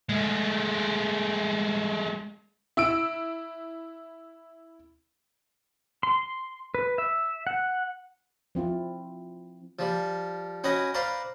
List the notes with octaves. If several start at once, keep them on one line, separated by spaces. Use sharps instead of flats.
G#3 A3
E4 E6 D7
C6
B4
E5
F#5
F3 C4 E4 F4
F3 G3
C#4 F#4 B4 D#5 G5 G#5
B4 C5 D5 F5 A#5